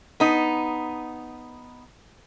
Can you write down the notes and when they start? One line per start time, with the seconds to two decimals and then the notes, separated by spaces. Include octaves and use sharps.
0.20 B3 D#4